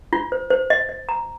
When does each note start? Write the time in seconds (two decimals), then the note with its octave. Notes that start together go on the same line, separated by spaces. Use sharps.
0.13 F4
0.32 C5
0.50 C5
0.70 D#5
0.89 D#5
1.09 A#5